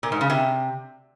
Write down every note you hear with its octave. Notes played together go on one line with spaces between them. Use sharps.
A#2
G#2
C#3
C3